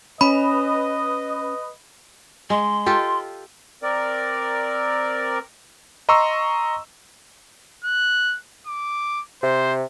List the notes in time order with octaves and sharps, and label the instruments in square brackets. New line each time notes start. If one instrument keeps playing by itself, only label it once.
[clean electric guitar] C#4 [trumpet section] B4 D#5 [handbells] B5
[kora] G#3 [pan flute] C6
[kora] F4 G4 A4
[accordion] C4 A#4 D5
[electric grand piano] D#5 A#5 C6 C#6 E6
[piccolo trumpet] F#6
D6
[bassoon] C3 [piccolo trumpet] C5